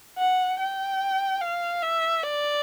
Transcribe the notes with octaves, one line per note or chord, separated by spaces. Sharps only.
F#5
G5
F5
E5
D5